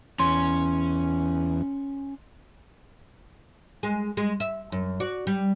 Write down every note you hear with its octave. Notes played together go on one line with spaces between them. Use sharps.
E2 C#4 C6
G#3
G#3
E5
F#2
F#4 D5
G3